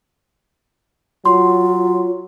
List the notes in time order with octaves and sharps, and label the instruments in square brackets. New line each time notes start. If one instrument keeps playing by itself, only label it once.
[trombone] F#3 [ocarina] F4 [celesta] C6